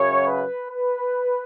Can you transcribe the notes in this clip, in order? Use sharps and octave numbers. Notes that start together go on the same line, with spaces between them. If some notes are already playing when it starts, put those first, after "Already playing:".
Already playing: F#2 C#3 C#5
B4
B4